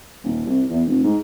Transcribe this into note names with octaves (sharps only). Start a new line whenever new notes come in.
D#1
C2
E2
F1
G#2